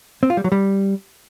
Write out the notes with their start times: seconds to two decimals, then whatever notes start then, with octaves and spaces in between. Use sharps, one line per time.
0.23 C4
0.30 F4
0.37 G3
0.44 F#3
0.52 G3